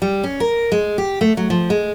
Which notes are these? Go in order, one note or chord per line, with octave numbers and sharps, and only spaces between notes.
G3
C#4
A#4
G#3
G4
A3
F#3
F3
G#3